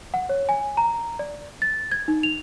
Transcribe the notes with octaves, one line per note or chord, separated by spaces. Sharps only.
F#5
C#5
G#5
A#5
D5
A6
G#6
D#4
F7